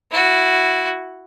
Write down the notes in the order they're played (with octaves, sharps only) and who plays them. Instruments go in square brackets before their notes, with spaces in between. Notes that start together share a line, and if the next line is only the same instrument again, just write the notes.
[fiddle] E4 F#4